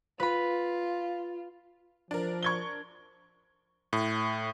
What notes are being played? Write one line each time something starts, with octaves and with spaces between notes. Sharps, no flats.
F4 B4 B5
F3 D4 A#4
C#6 G#6 G7
A2